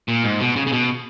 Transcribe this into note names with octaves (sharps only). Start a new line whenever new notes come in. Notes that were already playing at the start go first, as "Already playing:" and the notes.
A#2
G#2
B2
C#3
C#3
B2